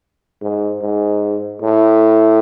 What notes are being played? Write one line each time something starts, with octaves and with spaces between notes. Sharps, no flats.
G#2
G#2
A2